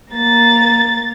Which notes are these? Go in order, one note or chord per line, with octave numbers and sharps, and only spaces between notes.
A#3 A#5 A6